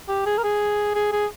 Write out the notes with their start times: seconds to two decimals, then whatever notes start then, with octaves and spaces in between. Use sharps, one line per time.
0.09 G4
0.26 G#4
0.38 A#4
0.44 G#4
0.95 G#4
1.12 G#4